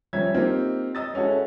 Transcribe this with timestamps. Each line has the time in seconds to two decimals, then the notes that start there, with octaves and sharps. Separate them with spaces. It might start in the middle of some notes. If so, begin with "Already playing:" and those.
0.13 F3 G3 C#4 E5 G#6
0.34 A#3 C4 D#4 F4 G4
0.95 D#5 D#6 E6 A6
1.14 G#3 C#4 E4 F#4 A4